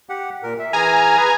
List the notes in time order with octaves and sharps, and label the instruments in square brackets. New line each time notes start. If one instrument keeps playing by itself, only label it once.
[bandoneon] G4 F#5
A#2 A#4
E5
[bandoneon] E3 G#4 F6 [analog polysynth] G#5 A#5
[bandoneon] G#4 B4